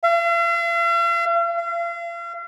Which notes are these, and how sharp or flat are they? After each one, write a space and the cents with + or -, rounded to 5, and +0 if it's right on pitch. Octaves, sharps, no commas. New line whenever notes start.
F5 -45
F5 -40